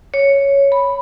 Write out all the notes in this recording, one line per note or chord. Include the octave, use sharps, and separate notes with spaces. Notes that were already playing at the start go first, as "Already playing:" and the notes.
C#5
B5